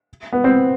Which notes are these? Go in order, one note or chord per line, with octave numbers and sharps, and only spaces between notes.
B3
C4